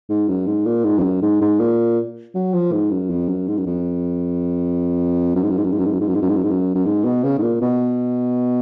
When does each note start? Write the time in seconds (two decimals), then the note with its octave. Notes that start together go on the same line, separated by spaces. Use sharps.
0.09 G#2
0.28 F#2
0.47 G#2
0.66 A#2
0.84 G#2
0.98 F2
1.03 F#2
1.22 G#2
1.41 G#2
1.59 A#2
2.34 F#3
2.54 F3
2.72 G#2
2.91 F#2
3.10 F2
3.28 F#2
3.48 G#2
3.57 F#2
3.66 F2
5.35 F#2
5.43 G#2
5.50 F#2
5.57 G#2
5.64 F#2
5.71 G#2
5.78 F#2
5.86 G#2
5.93 F#2
6.00 G#2
6.07 F#2
6.15 G#2
6.22 F#2
6.29 G#2
6.36 F#2
6.43 G#2
6.51 F#2
6.75 F#2
6.85 G#2
7.04 B2
7.24 C#3
7.38 G#2
7.42 A#2
7.61 B2